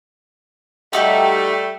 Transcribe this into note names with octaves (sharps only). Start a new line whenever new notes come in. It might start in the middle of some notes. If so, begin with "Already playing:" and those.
G3 A3 D#4 F#4 G4